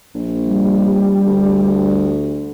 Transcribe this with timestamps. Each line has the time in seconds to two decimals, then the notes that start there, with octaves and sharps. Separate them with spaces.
0.15 A#1
0.45 G3
1.27 D2